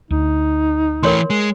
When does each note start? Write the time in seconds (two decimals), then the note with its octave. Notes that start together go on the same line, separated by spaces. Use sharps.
0.11 D2 D#4
1.03 E3 A3 A#4 C#5 C6
1.30 G#3